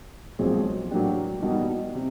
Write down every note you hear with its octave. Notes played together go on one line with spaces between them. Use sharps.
B1 A#2 F3 G#3 C4
A2 F#3 A#3 D4 G4
B2 G3 A#3 D#4
C3